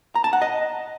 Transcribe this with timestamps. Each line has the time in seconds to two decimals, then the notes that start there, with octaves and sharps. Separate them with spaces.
0.15 A#5
0.24 A5
0.33 F#5
0.42 D#5